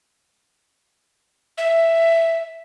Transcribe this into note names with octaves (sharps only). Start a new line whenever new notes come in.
E5